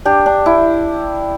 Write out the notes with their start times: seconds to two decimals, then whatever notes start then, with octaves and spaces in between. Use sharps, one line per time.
0.05 D4 G4
0.26 D4
0.46 E4